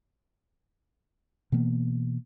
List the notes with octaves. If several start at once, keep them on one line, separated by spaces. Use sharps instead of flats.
B2 E3 A#3 B3